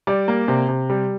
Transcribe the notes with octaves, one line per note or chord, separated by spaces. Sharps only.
G3 D5
A#3
C3
C3
G3